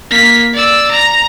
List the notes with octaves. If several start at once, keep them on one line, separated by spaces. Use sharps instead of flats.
A#3 B6
D5 E6
A#5